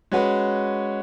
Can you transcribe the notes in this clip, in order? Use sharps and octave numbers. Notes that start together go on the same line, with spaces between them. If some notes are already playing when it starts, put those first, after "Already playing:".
G#3 C#4 F#4 B4